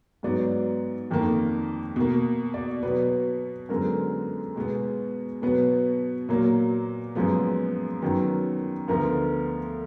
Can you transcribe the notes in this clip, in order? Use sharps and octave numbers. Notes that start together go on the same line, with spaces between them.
G#2 F#3 B3 D5
F2 D#3 A#3
B2 A#3
D5
B2 F#3 B3 B4
F#2 D3 G#3 B3 A#4
B2 G#3 B3
B2 F#3 B3 B4
A#2 F#3 A#3
F#2 F3 G#3 B3
F#2 D#3 F#3 B3
D2 D3 F3 B3 A#4